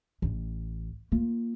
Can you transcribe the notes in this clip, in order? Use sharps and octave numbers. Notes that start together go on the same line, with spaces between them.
A1
A#3 F4